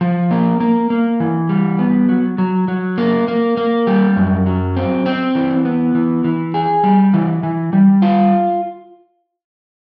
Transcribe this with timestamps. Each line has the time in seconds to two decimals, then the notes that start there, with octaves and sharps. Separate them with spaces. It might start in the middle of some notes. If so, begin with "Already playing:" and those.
0.01 F3
0.31 A#3
0.60 A#3
0.90 A#3
1.20 E3
1.49 G3
1.79 B3
2.09 F#3
2.38 F#3
2.68 F#3
2.98 A#3
3.28 A#3
3.57 A#3
3.87 G3
4.16 F#2
4.46 F#3
4.76 C4
5.06 C4
5.35 E3
5.65 B3
5.95 E3
6.24 E3
6.54 G#4
6.84 G3
7.14 E3
7.43 E3
7.73 G3
8.02 F4